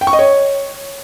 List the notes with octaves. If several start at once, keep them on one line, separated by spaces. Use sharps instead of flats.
G5
C#6
D#5
C#5